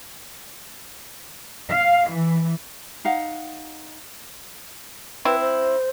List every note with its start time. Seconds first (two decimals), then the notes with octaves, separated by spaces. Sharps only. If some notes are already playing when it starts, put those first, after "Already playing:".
1.69 F5
2.10 E3
3.05 D#4 F5 F#5
5.25 C4 E4 B4
5.40 C5